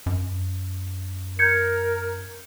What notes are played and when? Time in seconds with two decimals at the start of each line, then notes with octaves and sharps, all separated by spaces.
0.06 F#2
1.39 A#4 G6 G#6 C#7